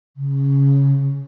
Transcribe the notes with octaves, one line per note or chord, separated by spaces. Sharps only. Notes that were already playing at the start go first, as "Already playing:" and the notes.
C#3